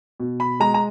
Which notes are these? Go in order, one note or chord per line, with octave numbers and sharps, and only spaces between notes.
B2
B5
G#3 A#5
A#5